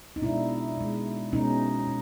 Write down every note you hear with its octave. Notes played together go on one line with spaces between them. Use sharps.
D#4
B2 G#3 D4 E4
B2 G#3
B2 G#3 C#4 D#4
B2